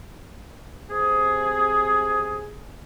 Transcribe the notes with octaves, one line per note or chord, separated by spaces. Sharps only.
C3 G#4